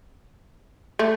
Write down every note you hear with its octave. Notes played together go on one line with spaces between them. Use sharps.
A3